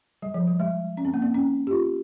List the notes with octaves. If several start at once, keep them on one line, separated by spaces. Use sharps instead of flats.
G3
F3
G3
G#3
C#4
C4
A#3
C4
C#4
G4
F4